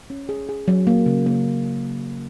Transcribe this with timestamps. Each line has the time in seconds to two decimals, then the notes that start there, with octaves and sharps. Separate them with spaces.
0.10 C#4
0.29 G#4
0.49 G#4
0.68 F#3
0.87 A#3
1.06 C#3
1.26 A#3